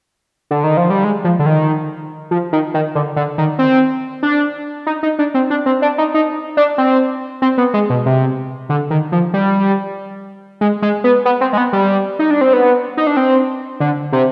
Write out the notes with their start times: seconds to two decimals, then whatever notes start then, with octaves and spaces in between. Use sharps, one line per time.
0.51 D3
0.64 D#3
0.77 F3
0.90 G3
1.04 G#3
1.24 F3
1.39 D3
1.46 D#3
2.31 F3
2.53 D#3
2.74 D#3
2.95 D3
3.16 D3
3.38 D#3
3.59 C4
4.23 D4
4.87 D#4
5.03 D#4
5.19 D4
5.34 C4
5.50 D4
5.66 C4
5.82 D4
5.98 D#4
6.14 D#4
6.57 D4
6.78 C4
7.42 C4
7.58 B3
7.74 G#3
7.90 B2
8.06 C3
8.69 D3
8.91 D#3
9.12 F3
9.34 G3
10.61 G#3
10.82 G#3
11.04 B3
11.25 B3
11.41 C4
11.53 G#3
11.57 B3
11.73 G3
12.19 D#4
12.31 D4
12.41 C4
12.53 B3
12.97 D#4
13.07 D4
13.17 C4
13.80 D3
14.13 C3